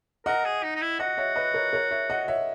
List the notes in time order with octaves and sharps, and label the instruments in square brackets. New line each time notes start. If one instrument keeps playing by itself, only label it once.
[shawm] A#4 [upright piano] D#5 F#5
[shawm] G#4
D#4
D#4
E4
[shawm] F#4 [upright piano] D#5 F#5
[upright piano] C#5 E5
B4 D#5
A#4 C#5
A#4 C#5
C#5 E5
D#5 F#5
C#5 E5